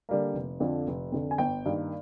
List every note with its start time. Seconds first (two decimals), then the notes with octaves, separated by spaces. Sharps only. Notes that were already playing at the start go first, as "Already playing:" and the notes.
0.09 D3 G3 A#3
0.34 F1
0.60 F2 D3 F3
0.87 F1
1.12 F2 D3 F3
1.31 G#5
1.38 G1 G5
1.66 G2 D#3 A#3